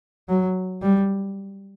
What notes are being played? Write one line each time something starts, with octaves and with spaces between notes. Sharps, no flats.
F#3
G3